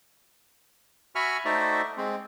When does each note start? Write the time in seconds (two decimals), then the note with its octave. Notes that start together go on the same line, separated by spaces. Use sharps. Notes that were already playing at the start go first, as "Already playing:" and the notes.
1.15 F#4 E5 G#5 B5 C#6 F6
1.45 A3 D#4 F#4 C5 D5 E5
1.97 G#3 C4